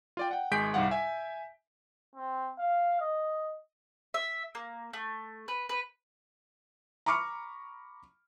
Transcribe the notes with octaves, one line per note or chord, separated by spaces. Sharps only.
F4 D5 G5
F#5 G5
G#1 G#3 G#4 G6 B6 D7
C2 G#2 G3 F5 F#5
E5 G#5
C4
F5
D#5
E5
A#3
A3
B4
B4
A#5 B5 C#6 D6 F6 C#7